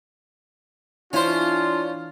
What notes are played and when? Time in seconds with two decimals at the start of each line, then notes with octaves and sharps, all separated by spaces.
1.13 E3 C#4 D4 E4 F4 C5